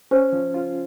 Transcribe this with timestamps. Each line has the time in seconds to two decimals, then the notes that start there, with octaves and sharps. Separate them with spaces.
0.11 C#4 C5
0.33 F3
0.54 F4